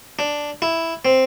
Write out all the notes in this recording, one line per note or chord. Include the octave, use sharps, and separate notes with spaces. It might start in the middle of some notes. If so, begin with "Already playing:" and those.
D4
E4
C4